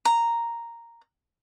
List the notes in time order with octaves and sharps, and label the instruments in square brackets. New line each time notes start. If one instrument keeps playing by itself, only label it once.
[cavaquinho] A#5